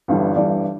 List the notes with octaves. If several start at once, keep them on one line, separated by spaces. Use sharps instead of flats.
G1 G2 E3 G3
G1 G2 E3 G3 D5